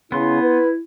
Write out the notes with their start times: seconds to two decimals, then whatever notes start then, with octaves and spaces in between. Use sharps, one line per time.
0.12 C#3 B3 E4 C6
0.43 B4